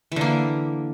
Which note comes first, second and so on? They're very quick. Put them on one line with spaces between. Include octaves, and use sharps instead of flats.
E3 D3 A#3